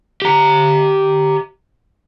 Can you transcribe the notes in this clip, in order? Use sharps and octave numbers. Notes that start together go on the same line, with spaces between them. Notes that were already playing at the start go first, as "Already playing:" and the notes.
G4 A#5